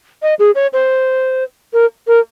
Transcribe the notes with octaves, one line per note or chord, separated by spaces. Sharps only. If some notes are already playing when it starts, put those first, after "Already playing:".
D#5
G#4
C#5
C5
A#4
A#4